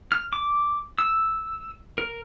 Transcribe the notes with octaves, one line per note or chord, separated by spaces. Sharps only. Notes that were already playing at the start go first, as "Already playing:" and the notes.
F6
D6
E6
A#4